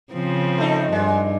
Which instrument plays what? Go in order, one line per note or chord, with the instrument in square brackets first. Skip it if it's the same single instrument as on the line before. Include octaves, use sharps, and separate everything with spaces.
[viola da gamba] C#3 F3 C4
[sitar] A3 D#4
[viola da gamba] G2 [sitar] G#3